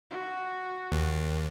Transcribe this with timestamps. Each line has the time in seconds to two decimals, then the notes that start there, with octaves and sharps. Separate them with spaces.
0.11 F#4
0.92 D#2